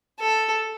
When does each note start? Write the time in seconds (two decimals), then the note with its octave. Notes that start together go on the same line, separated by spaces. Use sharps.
0.19 A4